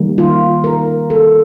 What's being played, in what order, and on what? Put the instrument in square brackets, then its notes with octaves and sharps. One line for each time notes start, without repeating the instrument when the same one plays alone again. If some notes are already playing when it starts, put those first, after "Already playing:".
Already playing: [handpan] D#3 G3 A#3
F4
A#4
A4